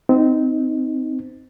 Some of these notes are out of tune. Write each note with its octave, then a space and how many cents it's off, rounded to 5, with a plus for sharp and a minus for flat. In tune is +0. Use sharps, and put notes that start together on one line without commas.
C4 -20 D#4 +0